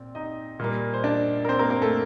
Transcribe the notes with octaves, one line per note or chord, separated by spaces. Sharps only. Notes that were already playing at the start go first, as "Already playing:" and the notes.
Already playing: A#2 C4 D5
D#4 D#5
A#2 G3 A#3
C5
D4 D5
A#4
C4 C5
A#3 A#4
A#3 A#4
A3 A4